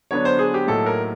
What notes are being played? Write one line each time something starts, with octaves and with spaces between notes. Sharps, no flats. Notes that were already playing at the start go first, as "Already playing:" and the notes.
D3 F#3 B3 D4 C#5
C5
G#4
G4
A2 F#3 A#3 D#4 A4
A#4